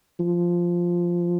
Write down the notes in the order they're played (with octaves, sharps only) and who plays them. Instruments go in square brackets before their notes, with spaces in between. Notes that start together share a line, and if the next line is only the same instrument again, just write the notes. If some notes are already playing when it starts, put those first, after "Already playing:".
[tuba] F3